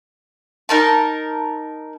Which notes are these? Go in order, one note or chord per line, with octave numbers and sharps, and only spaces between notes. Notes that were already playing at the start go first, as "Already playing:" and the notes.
D#4 A#4 A5